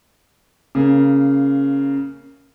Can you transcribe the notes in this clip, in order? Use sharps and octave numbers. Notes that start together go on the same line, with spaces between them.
C#3 A#3